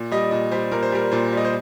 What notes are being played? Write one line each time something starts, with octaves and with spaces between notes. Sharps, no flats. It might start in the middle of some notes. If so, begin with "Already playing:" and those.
Already playing: A#2
G3 D#5
A#2 D#5
G3 C5
A#2 A#4
C5
G3 A#4
A#2 C5
G3 D#5
C5